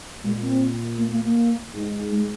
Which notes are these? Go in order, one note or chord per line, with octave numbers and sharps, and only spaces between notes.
A#2 G#3
C4
A#3
A#3
A#3
G#2
G#3